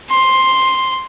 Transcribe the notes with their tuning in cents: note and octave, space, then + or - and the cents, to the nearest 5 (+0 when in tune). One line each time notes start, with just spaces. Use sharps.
C6 +5